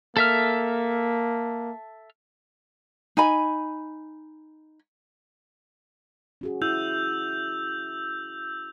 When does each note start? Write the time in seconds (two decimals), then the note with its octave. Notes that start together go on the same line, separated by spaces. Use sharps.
0.17 A#3 A4 E5 F6
3.17 D#4 G#5 B5
6.41 C#4 F#4 G#4
6.62 E4 E6 G6 F7